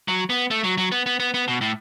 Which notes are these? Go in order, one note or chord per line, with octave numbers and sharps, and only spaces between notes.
F#3
B3
A3
F#3
F#3
B3
B3
B3
B3
B2
A2